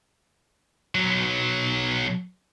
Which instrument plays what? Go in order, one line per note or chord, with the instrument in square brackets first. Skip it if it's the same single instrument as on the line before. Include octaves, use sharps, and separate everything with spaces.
[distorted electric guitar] B1 F#3